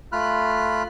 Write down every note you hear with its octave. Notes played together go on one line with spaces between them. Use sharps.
A3 F4 B5 F6 F#6